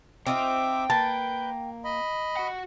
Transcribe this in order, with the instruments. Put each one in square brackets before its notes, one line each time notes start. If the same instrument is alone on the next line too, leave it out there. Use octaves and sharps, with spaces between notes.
[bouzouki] C4 D#4 F4 [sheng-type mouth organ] E5 D6 [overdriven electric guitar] G5
[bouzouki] A#3 [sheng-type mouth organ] B4 G6 [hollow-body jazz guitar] A5
[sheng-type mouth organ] D#5 B5
[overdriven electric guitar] F#4 F#5